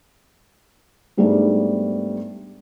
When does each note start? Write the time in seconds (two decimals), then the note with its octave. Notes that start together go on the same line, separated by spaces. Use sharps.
1.17 G#2 G3 A3 B3 D4 G#4